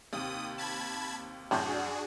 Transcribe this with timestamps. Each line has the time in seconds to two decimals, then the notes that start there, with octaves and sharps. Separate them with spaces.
0.13 D#2 C3 D#6
0.58 A5 B5 G#6
1.51 F#2 A2 C3 D4 F#4 G#4 G6